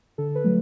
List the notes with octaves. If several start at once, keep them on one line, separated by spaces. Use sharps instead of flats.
D3 A4
B4
F#3 A3